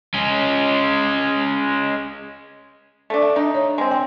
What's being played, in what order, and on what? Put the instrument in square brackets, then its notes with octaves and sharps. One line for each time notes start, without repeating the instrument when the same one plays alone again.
[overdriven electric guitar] G#3 C#4
[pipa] A3 D4
[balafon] E5
[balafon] D4 E5 [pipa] D#4
[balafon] C#5
[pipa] G#3 C4
[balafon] G5